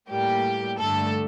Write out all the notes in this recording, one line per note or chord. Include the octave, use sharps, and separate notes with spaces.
A2 G3 A#3 G4
G2 D3 A3 A4